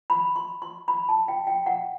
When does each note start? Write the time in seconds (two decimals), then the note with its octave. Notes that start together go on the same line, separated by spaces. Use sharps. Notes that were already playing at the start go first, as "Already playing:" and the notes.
0.10 B5
0.36 C6
0.62 C6
0.88 B5
1.09 A5
1.28 G5
1.47 G5
1.66 F#5